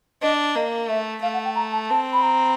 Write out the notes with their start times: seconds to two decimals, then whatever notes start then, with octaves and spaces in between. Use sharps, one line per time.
0.22 D4 D#5
0.55 A#3 D#5
0.89 A3 E5
1.22 A3 F5
1.34 F#5
1.45 G5
1.55 A#5
1.73 A5
1.90 C4 A5
2.13 B5
2.23 A#5